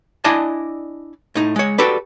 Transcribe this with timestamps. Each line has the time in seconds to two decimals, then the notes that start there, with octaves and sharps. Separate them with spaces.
0.24 D4 E4 D5 D#5 G#5 A5
1.35 A2 D#4
1.56 G#3 C#5
1.78 F#4 G4 A4 B4 D5